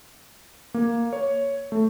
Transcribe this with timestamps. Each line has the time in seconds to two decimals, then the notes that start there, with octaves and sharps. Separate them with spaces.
0.74 A#3
1.13 C#5
1.72 A3